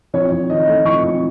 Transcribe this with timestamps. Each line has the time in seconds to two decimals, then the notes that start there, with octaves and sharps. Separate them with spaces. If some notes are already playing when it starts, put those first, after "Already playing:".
0.14 F2 C#5
0.31 F2
0.50 D#3 D#5
0.67 A3
0.85 F2 C#6
1.03 F2